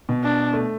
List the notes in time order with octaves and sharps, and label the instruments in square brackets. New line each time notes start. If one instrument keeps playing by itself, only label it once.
[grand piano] B2
[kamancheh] D4
[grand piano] A3